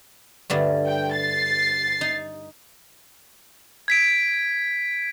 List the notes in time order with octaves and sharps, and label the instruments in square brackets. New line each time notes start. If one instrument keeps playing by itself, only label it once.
[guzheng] G2 D3 A3
[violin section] G5
A6 C7
[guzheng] D#4
[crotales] G#6 B6 D7